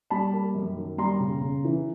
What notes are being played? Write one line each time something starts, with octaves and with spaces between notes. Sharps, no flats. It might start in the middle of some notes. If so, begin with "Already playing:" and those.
G3 A5 B5
A#3
F#2
D#3
G3 A#5 C6
C#3
C#3
E3